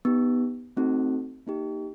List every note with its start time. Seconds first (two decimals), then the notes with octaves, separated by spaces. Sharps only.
0.05 B3 D#4 G4
0.77 A3 C4 D#4 F#4 A4
1.47 A#3 D#4 G4